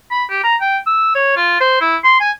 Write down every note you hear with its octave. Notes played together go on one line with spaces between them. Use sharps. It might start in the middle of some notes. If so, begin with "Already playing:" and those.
B5
G4
A#5
G5
E6
C#5
F4
C5
E4
C6
G#5